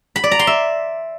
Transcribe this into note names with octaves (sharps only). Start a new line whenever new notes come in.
B5
D5
A#5
C6
E5